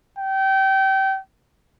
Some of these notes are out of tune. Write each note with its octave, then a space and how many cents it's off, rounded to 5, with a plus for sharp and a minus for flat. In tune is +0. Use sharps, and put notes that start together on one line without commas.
G5 -25